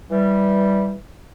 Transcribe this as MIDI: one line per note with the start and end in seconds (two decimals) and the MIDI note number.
0.10 0.95 52
0.10 0.95 55